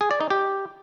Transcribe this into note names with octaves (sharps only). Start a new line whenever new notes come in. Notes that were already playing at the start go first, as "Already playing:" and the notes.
G#4
D5
D#4
G4